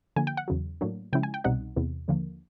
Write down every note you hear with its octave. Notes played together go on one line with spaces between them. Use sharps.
D3 F3 A#3 G#5
G5
F#5
E2 C#3 F#3
A2 F#3 A#3 D4
C#3 F3 G#3 C#4 E4 G5
G#5
G5
C2 B2 G3 C4 D#4 F#5
E2 C3 E3
D#2 D3 F3 A#3